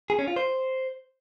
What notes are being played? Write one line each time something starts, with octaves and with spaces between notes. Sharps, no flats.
G#4
C#4
F4
C5